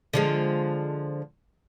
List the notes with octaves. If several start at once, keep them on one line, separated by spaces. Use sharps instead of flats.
D3 F3 G#3